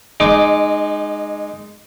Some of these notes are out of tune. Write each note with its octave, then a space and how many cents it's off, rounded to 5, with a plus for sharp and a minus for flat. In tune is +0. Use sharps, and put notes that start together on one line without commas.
G#3 +0 D#4 -25 D6 +0